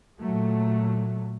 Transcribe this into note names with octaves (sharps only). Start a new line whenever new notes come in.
A#2 F#3 A3